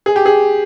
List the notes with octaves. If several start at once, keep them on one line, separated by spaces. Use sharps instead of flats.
G#4
G4
G#4